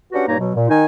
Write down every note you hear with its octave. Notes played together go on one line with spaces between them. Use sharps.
C#4 D4 F#4 G4 B4 F#5
G2 A#2 A#3 D#4 C#5 A#5
B2 F#3
A#2
D#3 D#4 G#5